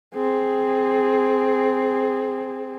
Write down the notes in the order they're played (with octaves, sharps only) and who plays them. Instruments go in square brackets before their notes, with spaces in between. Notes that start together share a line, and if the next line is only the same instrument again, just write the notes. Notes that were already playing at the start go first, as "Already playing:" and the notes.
[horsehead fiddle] C4 G#4